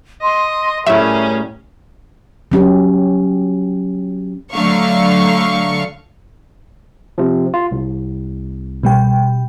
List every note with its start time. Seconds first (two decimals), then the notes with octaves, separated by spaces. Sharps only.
0.22 D#5 C6
0.86 A2 G3 A3 C#4 G#4 A#4 E5
2.52 F#3 C#4 G4
4.53 D3 F#3 A3 F5 C#6
7.18 C3 F3
7.54 F4
7.72 C2
8.83 B2 G3 G5